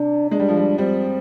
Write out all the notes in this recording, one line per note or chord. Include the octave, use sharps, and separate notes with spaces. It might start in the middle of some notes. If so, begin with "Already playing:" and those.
Already playing: C3 D4
G#3 D4
G3
F3
G3
G3 C4